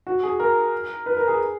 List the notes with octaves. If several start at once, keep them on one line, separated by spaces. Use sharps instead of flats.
F#4
G#4
A#4
B4
A#4
G#4